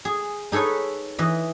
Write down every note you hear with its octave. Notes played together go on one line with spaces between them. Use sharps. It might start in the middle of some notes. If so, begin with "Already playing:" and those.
G#4
D#4 G#4 A4 B4 C#5
E3 D#5